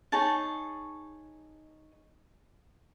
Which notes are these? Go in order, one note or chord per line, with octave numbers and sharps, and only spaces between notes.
D#4 G#4 C#5 A5